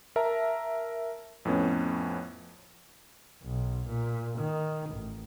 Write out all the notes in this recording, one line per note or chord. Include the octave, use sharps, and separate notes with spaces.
A#4 E5 A5 A#5
F2 A2 B3 C#4
B1
A#2
D#3
A1